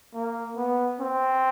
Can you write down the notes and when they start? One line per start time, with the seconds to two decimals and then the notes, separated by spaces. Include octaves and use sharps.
0.14 A#3
0.57 B3
1.00 C4